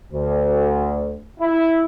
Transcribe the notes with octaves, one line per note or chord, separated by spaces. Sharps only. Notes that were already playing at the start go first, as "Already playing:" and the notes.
D2
E4